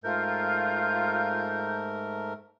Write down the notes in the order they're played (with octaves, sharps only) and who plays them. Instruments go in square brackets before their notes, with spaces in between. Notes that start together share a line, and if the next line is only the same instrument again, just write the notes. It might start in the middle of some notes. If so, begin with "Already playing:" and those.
[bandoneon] G#2 A3 A#4 [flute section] F4 [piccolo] G6